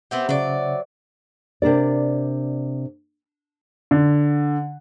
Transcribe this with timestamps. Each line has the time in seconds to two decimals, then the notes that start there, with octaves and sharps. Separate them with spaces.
0.11 B3 C4 G4 C5 E5 F#5
0.29 C#3 F#3 D5
1.62 C3 D4 A#4 D5
3.91 D3